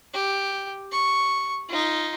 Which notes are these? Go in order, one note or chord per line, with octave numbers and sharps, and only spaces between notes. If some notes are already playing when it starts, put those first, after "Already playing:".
G4
C#6
D#4 F4